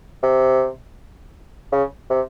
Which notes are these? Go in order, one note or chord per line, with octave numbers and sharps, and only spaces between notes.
C3
C#3
C3